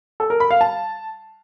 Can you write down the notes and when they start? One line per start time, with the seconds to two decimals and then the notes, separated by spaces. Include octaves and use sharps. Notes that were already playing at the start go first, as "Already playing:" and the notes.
0.20 A4
0.30 A#4
0.40 B5
0.51 F5
0.61 A5